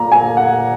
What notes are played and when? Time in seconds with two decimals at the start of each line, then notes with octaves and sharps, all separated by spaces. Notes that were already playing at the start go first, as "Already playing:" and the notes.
Already playing: A#2 A#5
0.12 G#5
0.37 F#5